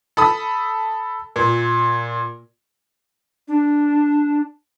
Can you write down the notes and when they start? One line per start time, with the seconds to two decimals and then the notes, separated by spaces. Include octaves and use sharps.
0.17 A4 B5 D#6
1.36 A#2
3.48 D4